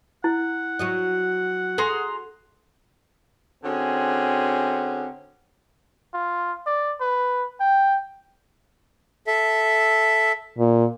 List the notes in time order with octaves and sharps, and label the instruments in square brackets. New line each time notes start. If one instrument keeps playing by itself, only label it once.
[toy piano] E4 [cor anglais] F#5
[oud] F#3 F#4 D#5
[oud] F#4 [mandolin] G#4 A#5 C6 [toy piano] A4
[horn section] D3 C4 C#4 F#4 G#4
[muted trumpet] F4
D5
B4
G5
[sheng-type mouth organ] A4 E5
[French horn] A#2